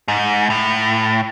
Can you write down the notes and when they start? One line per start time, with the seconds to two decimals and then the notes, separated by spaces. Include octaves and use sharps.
0.08 G#2
0.50 A2